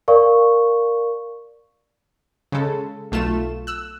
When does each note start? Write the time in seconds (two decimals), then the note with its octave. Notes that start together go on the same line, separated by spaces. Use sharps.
0.08 A#4 D5 F5 C#6
2.52 C#3 G#3 A4
3.12 B1 A3 F4 E7
3.67 E6 F#6